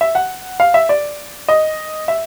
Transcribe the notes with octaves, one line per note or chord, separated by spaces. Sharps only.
E5
F#5
F5
E5
D5
D#5
E5